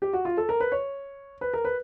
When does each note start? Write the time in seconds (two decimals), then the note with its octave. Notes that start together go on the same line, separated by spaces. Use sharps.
0.02 G4
0.13 F#4
0.25 F4
0.37 A4
0.49 A#4
0.60 B4
0.72 C#5
1.41 B4
1.54 A#4
1.65 B4